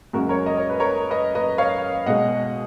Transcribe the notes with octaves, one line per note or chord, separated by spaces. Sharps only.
F#2 C#3 G#3 F#4 A#4
A#4 C#5
D#5
C#5
B4
A#4 C#5
B4 D#5
B4 D#5
C#5 F5
B2 G#3 D#5 F#5